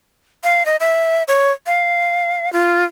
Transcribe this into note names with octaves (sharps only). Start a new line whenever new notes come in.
F5
D#5
E5
C#5
F5
F4